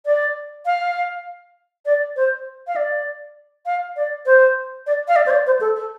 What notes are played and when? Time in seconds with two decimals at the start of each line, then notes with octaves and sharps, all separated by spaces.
0.06 D5
0.66 F5
1.86 D5
2.16 C5
2.67 F5
2.76 D5
3.66 F5
3.96 D5
4.26 C5
4.87 D5
5.08 F5
5.16 D5
5.26 C5
5.31 D5
5.46 C5
5.61 A4
5.76 A4